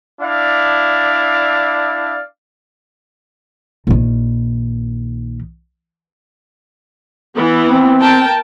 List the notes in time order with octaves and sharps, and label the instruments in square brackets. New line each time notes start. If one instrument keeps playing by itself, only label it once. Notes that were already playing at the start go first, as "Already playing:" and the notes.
[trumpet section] D4 E4 D5 F5
[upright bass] A#1 D#3
[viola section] E3 B3
[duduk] C4
[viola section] A#4 G5 A5